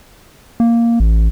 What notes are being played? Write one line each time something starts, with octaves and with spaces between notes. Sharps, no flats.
A#3
A1